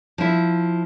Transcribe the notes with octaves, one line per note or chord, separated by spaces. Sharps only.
F3 E4